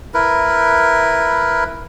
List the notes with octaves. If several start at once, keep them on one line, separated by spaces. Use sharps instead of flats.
E4 A#4 B4